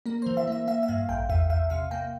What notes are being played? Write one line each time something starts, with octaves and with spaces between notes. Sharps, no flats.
A#3 A#4
E3 C5
E5
A#3 E5
A#3 E5
E5
G2 F5
A1 G5
E2 E5
E2 E5
C3 F5
A#3 G5